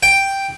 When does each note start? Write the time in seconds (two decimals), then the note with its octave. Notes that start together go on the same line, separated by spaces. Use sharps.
0.03 G5